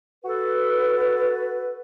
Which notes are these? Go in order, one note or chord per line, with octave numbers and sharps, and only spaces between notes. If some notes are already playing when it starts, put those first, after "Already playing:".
F#4 A4 B4